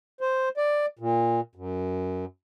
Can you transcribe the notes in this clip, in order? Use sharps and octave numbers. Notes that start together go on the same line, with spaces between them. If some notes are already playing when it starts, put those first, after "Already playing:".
C5
D5
A#2
F#2